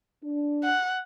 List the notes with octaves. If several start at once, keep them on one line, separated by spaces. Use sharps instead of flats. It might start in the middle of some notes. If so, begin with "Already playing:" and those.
D4
F#5